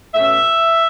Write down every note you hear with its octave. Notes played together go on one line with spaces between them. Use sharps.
B2 A3 C#4 E5